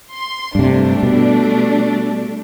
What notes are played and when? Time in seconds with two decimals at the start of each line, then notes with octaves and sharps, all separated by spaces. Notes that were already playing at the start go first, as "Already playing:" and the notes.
0.12 C6
0.55 G2 C3 G3 A3 D4
1.03 B2